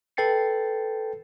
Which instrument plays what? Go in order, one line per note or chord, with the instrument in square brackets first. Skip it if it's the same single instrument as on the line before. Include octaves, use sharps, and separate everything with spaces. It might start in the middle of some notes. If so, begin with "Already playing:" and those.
[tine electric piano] A4 B4 G5 A6 C7 C#7